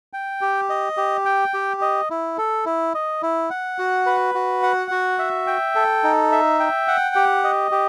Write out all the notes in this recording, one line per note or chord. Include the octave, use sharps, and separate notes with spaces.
G5
G4
D#5
G4
G5
G4
D#5
E4
A4
E4
D#5
E4
F#5
F#4
B4
F#4
F#5
F#4
E5
G5
A4
D#4
E5
G5
F#5
G4
D#5
G4